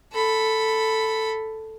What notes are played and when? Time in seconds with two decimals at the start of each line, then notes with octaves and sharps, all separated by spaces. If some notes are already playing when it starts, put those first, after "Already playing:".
0.13 A4 B5